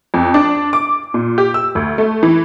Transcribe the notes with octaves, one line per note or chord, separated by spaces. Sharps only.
F2
D4
D6
A#2
G4
E6
D2
A3
E3